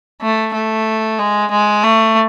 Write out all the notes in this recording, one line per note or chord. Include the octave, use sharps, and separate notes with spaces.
A3
A3
G#3
G#3
A3